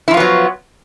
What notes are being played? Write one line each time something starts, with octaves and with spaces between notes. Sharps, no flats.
F3 F#3 B3 E4 F4